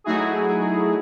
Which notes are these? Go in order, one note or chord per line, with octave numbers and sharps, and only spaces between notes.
F#3 A3 D#4 E4 F#4 G#4